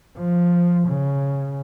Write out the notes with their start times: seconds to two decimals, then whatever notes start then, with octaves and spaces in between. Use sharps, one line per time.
0.18 F3
0.88 C#3